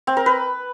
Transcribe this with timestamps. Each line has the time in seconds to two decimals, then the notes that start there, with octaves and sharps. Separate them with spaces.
0.07 C4
0.17 A#4
0.26 B4